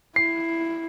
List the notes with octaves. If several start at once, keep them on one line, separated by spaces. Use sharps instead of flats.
E4 C7